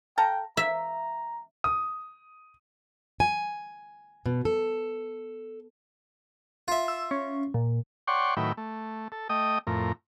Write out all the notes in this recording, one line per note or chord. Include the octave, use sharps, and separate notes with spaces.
A4 F5 G5 A#5
A#3 E5 A#5
D#6
G#5
B2
A4
F4 E5
E6
C#4
A#2
C#5 D5 F#5 G5 C6 C#6
A2 D#3 F#3 B4 E5 G5
A3
A4
A3 D#5 G5 D#6
F2 A2 A#4